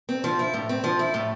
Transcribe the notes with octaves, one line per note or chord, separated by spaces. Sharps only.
C4
F3
E4
A2
C4
F3
E4
A2